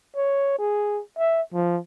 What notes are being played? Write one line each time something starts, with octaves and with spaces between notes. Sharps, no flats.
C#5
G#4
E5
F3